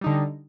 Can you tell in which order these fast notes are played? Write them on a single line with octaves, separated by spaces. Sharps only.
G3 D#4 D3